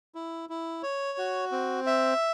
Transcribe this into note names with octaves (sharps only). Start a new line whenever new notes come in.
E4
E4
C#5
F#4
C4
E5